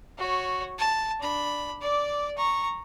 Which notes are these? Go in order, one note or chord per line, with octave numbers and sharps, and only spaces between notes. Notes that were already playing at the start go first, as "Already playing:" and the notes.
F#4 C#5
A5
D4 B5
D5 D6
A#5 C#6